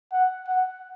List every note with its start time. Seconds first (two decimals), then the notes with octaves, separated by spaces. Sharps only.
0.12 F#5
0.48 F#5